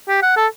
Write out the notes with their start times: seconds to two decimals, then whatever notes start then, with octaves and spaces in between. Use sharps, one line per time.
0.08 G4
0.23 F#5
0.37 A4